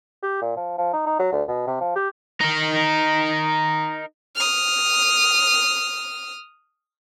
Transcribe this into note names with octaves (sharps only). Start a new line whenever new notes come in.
G4
A#2
F3
F3
D#4
D#4
F#3
D2
B2
C3
F3
G4
D#4 A#4
D#6 F6